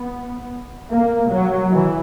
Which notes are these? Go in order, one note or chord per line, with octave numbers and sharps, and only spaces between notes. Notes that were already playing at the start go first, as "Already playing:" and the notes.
Already playing: B3
A#3
F#3
E3